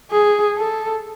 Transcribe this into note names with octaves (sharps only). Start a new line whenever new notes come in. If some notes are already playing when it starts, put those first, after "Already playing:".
G#4
A4